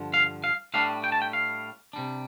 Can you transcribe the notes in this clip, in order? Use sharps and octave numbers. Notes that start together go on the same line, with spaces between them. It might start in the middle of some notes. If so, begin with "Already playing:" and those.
Already playing: G2 D3 F3
F5
F5
A2 G3 D4 F5
G5
A5
G5
F5
C3 G3 D4